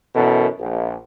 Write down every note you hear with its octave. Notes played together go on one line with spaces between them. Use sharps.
F#2 B2 E3 A4 A#4
A#1